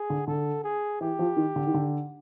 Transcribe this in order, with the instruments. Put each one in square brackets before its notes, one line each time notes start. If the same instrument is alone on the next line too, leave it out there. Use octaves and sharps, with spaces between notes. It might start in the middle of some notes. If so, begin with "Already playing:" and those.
Already playing: [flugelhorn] G#4
[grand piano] D3
[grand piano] D3 [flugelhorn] A4
[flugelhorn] G#4
[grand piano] E3 [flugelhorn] G4
[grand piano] F3
D#3
D3
D#3
D3